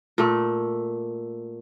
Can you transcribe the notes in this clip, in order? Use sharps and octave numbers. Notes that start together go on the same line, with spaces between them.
A#2 A3